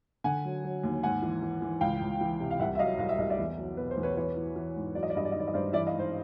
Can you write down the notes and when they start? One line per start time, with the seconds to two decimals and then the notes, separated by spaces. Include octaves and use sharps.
0.24 D3 F#5 G#5
0.45 F#3
0.64 F#3
0.83 D#2
1.03 G#2 F#5 G#5
1.22 E3
1.42 E3
1.62 E3
1.81 C#2 F5 G5
2.01 C#2
2.21 E3
2.40 C3
2.51 F5
2.60 C2 E5 F#5
2.75 E5
2.79 F#3 D#5 F5
2.99 C2 F5
3.09 E5
3.18 C2 D#5
3.30 D5 E5
3.38 E2
3.58 F#3
3.77 B2 B4
3.91 C5
3.97 E2
4.03 B4 C#5
4.16 E3 B4 C#5
4.36 E3
4.56 E3
4.76 G#2
4.95 F#3 D5
5.03 D#5
5.10 D5
5.15 G2 D#5
5.25 D5
5.32 D#3 D#5
5.40 D5
5.47 D#5
5.54 G2 C5 D5
5.73 E3 D5 E5
5.87 D#5 F5
5.93 G#2
5.99 C5